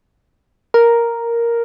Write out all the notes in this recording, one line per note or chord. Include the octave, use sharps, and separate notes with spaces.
A#4